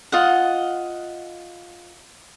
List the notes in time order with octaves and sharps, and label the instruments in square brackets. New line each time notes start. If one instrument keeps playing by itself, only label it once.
[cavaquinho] F4 D#5 F#5